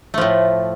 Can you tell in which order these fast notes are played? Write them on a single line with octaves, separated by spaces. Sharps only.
A3 F3 A2